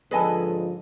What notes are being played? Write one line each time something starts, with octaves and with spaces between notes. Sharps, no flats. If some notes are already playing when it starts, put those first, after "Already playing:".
G#2 D3 F3 G#4 A4 B4 D#5 G#5